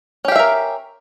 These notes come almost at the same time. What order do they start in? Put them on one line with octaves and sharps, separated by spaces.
C#4 G4 F5 E5 A#4